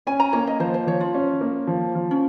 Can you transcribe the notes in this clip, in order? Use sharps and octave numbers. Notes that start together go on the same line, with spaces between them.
C#4 G#5
A#5
A#3 C#5
D#5
F3 C5
C5
F3 C#5
F4
C#4
A#3
F3
F3
C#4